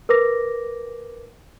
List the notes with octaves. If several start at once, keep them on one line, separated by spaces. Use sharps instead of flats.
A#4 B4 D6 A#6